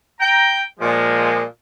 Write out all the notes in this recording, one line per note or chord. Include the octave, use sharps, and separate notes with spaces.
G5 A#5
A#2 F3 G#3